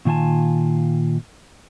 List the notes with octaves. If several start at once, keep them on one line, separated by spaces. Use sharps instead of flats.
A#2 D#3 F4 G#5 A5